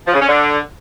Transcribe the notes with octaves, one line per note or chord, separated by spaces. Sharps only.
F3
C#3
C#4
D3